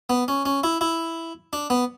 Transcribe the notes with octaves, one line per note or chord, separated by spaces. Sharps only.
B3
C#4
C#4
E4
E4
D4
B3